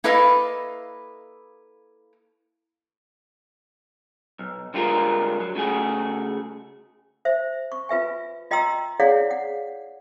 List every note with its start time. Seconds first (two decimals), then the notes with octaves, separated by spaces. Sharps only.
0.04 A#3 E4 A4 B4 D#5 F5
4.39 B1
4.74 D3 G3 G#3 F4 G#4 A#4
5.40 F#3
5.55 C#3 A3 F#4 G#4
7.25 C5 E5
7.72 C#6
7.89 F4 B4 E5 G#5
8.51 F4 D#5 G5 A#5 C6 E6
9.00 E4 G#4 C#5 D5 F5 F#5
9.31 F#5